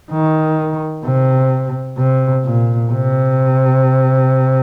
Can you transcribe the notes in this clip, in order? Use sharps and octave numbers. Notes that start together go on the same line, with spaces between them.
D#3
C3
C3
A#2
C3